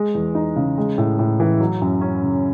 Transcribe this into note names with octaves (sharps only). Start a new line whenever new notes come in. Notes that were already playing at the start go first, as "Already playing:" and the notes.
Already playing: G#3
E2
D#4
C#3
G#3
A2
A2
E3
F#3
F#2
C#4
C#3